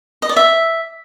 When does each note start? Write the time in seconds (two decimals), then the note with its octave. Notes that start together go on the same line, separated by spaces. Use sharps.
0.22 D#5
0.29 D5
0.36 E5